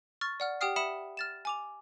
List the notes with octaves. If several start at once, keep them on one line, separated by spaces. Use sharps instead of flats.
C#6 F6 A6
D5 F#5 F6
G4 F#5 G5 D#6 F6 C7
E5 B5 D#6 C#7 E7
F6 A6 E7
G#5 D6 F7